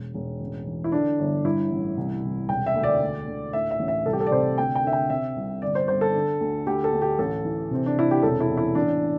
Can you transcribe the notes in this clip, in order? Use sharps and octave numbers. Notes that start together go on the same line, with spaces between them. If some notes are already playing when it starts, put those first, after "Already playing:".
Already playing: E1
E1
A1
E3
E4
D3 D4
G1
G2 E4
A1
C2
C2
E1 G5
E5
D2
D5
D2
D2
A2 E5
E5
A1
E5
C2 A4
G4
A4
D5
C3 C5
D2 G5
G5
D3 E5
G5
C3 E5
C2
G1 D5
C5
G1 C5
A4
D3
D2
D2 G4
A4
D2
G4
A1 A4
E3
C3 C4
D4
C3 E4
G4
E1 A4
E4
E2
E4
A1 D4